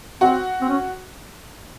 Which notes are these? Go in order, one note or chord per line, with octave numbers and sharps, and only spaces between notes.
C4 F#4
C4
C#4